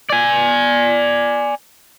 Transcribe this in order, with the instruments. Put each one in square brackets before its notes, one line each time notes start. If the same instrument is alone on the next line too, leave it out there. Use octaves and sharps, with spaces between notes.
[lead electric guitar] D5 G#5